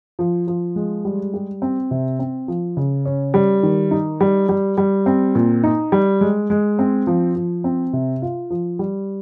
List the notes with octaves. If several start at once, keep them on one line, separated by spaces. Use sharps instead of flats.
F3
F3
G#3
G3
G4
C4
C3
C4
F3
C#3
C#4
G3
D#3
D#4
G3
G3
G3
C4
A#2
D#4
G3
G#3
G#3
C4
F3
F3
C4
C3
F4
F3
G3